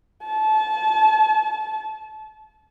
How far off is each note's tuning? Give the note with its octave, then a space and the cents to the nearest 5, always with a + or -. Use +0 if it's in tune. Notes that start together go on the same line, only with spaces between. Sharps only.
A5 -30